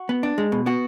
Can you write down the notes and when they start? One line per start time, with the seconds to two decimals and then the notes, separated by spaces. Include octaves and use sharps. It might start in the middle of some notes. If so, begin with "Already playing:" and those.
Already playing: F#4
0.09 B3
0.23 D4
0.38 G#3
0.52 B2
0.66 B3 F#4